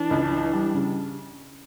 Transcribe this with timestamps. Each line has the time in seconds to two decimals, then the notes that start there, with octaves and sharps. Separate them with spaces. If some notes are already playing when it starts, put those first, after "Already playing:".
Already playing: E3 D4
0.10 C#2
0.31 E3
0.53 G3
0.74 C#3